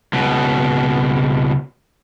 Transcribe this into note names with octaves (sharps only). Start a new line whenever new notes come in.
C#2 B2